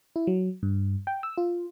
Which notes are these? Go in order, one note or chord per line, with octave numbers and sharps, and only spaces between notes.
E4
F#3
G2
G5
E6
F4